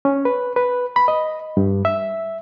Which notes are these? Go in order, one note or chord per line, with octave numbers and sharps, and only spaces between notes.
C#4
B4
B4
B5
D#5
G2
E5